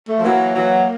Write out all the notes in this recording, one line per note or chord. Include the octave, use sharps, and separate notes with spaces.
A3
F3
E3 F#3 A#3
E3 F#3